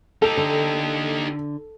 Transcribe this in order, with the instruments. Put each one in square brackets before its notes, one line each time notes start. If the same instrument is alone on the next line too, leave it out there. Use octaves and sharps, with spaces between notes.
[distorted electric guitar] D#4 G4 [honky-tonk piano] A4
[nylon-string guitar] D3